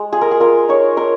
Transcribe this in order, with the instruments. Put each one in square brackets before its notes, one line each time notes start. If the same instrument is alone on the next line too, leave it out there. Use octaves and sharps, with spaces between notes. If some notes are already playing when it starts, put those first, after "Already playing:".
Already playing: [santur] G#3
F4 G#4
A#4
G#4
F4 A#4
D#4 C#5
D#4 A#4